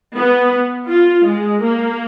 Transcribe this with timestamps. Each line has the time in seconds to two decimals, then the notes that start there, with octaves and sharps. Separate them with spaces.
0.16 B3
0.89 F4
1.26 G#3
1.63 A#3